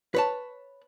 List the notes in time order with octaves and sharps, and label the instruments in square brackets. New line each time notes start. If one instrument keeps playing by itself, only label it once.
[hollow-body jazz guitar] B4 C#5 A5